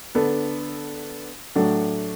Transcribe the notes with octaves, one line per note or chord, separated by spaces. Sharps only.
D3 B3 D4 A4
A2 F#3 A3 D4 F#4